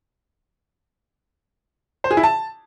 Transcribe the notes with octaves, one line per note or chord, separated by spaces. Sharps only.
C5
G#4
E4
A5